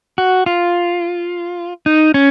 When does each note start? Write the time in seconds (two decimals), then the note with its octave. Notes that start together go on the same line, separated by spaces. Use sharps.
0.18 F#4
0.46 F4
1.86 D#4
2.14 C#4